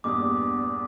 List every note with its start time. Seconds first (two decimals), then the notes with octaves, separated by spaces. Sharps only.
0.04 E2 G2 A#2 B3 D6 D#6